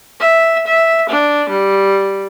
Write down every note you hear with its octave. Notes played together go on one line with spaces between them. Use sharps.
E5
E5
D4
G3